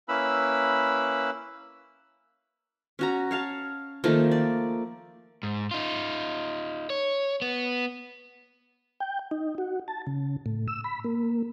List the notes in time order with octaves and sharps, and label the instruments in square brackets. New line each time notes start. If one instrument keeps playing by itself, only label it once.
[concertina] A#3 C#4 E4 B4 B5 E6
[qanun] C#4 F#4 A#5
C#5 F5 A5
D#3 F3 A3 A#3
D5
[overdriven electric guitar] G#2
D#4 F4
C#5
B3
[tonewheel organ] G5
D#4
F#4
A5
C#3
A2
E6
B5
A#3